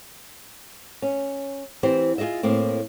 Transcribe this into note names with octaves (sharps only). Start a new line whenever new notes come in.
C#4
E3 C4 G4 C5
F4 G4 G#4 D#5 E5
A2 A#3 C4